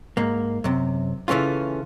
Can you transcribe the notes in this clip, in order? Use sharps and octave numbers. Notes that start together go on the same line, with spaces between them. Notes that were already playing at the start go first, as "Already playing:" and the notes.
G#2 A#3
F#2 C3
C#3 E3 A3 C#4 F4